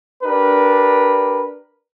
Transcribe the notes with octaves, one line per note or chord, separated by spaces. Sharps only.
D4 G4 A#4 B4